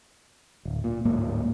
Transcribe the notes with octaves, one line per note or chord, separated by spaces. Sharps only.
D1
A#2
D1 G#2 A#3